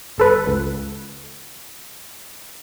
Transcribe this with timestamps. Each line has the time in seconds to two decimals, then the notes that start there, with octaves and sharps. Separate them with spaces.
0.18 G1 A4 B4
0.47 C#2